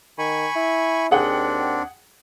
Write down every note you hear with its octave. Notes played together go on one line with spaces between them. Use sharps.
D#3 G#5 B5 C#6
E4
D#2 C4 D4 G#4 F#5 G5